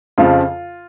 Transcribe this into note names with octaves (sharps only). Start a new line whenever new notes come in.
F2 C#3 F3 F4